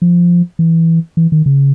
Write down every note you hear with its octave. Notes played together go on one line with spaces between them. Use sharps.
F3
E3
E3
D#3
C#3